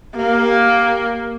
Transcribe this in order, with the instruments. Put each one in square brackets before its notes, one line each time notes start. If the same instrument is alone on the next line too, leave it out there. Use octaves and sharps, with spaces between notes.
[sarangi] A#3 [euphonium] G4